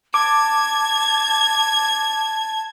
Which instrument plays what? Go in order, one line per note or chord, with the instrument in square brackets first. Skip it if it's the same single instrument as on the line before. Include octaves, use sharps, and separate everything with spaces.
[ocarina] A5 [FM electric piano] D6 [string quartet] G#6